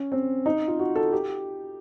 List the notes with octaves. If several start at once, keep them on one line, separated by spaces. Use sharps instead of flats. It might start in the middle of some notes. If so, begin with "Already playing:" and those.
Already playing: C#4
C4
D#4
F4
F#4
A4
G4